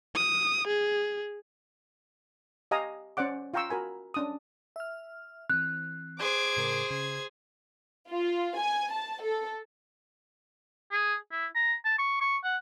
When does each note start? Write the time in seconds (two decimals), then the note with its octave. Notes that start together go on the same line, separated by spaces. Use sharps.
0.15 D#6
0.67 G#4
2.71 G4 D#5 F5 G#5 A#5 D#6
3.17 C#4 C5 D5 F#5 D6
3.54 F4 F5 G5 A#5 C#6 E6
3.69 F#4 A#4 G#5 B5
4.14 C#4 D4 D#6
4.76 E5 F6
5.50 E3 C4 F#6
6.19 G#4 C5 D6 G#6
6.57 A2 C#3 A#4
6.91 C#3 G#6
8.10 F4
8.58 G#5
8.92 A5
9.24 A4
10.91 G#4
11.32 E4
11.55 A#5
11.85 A5
11.99 C#6
12.21 C#6
12.44 F#5